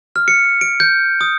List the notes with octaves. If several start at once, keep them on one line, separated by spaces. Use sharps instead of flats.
F6
C#7
D7
G6
D#6